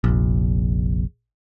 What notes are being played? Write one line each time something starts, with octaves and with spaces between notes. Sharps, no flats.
F1 A#1